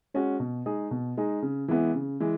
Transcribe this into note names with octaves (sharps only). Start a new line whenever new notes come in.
G#3 C#4 F#4
B2
G#3 D#4 G#4
B2
G#3 D#4 G#4
C#3
E3 G#3 B3 E4
C#3
E3 G#3